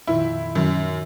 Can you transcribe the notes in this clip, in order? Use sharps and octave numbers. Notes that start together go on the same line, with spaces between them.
F2 A#2 D#3 E4
F#2 D#3